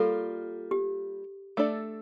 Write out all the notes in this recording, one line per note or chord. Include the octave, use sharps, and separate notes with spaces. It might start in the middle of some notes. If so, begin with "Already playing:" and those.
Already playing: G3 A#3 F4 A4
G4
A3 D4 A4 D5